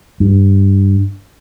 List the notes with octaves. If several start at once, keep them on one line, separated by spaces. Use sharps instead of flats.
G2